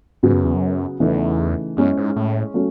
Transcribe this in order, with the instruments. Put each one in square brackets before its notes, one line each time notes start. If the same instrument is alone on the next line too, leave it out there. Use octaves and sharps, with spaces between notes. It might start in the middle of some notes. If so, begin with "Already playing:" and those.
[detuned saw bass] G#2 [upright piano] C#3 F#3 B3 F#4
[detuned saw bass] F#2
E2
F#2
[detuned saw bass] E2 [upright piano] C#3 E3 A3 D#4
[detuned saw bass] F#2 [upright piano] G#3 C#4 E4 G#4
[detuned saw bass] G#2
A2
[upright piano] F#3 A3 C#4